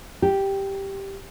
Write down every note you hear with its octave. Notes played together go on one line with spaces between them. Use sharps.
G4